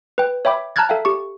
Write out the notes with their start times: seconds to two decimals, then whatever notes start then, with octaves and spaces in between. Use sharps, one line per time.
0.18 B4 G5
0.45 C#5 E5 G5 B5 D6
0.76 A5 A#5 F6 F#6 G#6 A6
0.89 A4 E5 F5 G5
1.05 G4 C#6